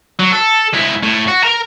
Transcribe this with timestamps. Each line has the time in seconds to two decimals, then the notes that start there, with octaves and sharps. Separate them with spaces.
0.19 F#3
0.32 A4
0.73 G#3 E4
1.03 A2
1.28 F#4
1.43 A#4 A#5